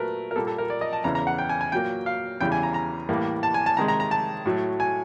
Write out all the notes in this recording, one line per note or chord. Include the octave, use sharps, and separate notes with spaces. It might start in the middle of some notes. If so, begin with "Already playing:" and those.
Already playing: A#2 F#3 A3 A#4 B4
A#4
A#2 G3 A#3 A4
A4
A#4
D5
D#5
A5
E2 C#3 E3 A#5
A#5
F#5
G5
G#5
G#5
A#2 F#3 A#3 G5
F5
E2 C#3 E3 G3 G5
G#5
A#5
A#5
A2 E3 G3 A#3
A5
G#5
A5
C3 D#3 G#3 A#5
A#5
A#5
A5
A2 F#3 A3
G#5